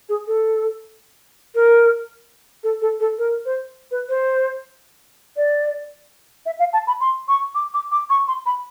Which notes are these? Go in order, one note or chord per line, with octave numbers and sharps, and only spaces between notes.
G#4
A4
A#4
A4
A4
A4
A#4
C5
B4
C5
D5
E5
F5
A5
B5
C6
C#6
D6
D6
D6
C#6
C6
B5